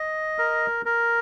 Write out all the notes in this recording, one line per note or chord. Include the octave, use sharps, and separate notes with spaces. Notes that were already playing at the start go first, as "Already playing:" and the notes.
Already playing: D#5
A#4
A#4